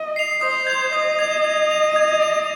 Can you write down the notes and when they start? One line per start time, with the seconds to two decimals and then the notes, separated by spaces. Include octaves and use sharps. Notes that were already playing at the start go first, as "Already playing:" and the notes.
Already playing: D#5
0.16 C7 F7
0.41 C5 D#6
0.67 G#6 F7
0.93 D#5 D#6
1.19 G#6 F7
1.44 G#6
1.71 F7
1.96 G#6
2.22 F7